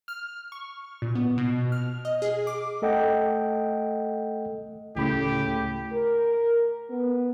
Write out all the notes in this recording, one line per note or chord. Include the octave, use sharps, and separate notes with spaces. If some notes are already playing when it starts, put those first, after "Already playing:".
F6
C#6
A#2
B3
B2
F6
D#5
G#4
D6
A3 A4 D#5 F#5 G5
D2 A2 C#3 A3 G4 G#4 B5
A#4
B3